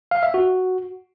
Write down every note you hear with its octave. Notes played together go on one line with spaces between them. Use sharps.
F5
E5
F#4